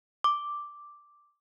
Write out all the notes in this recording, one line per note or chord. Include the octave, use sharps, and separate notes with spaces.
D6